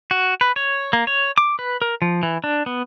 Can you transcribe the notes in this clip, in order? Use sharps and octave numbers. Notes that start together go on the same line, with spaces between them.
F#4
B4
C#5
A#3
C#5
D6
B4
A#4
F3
E3
D4
B3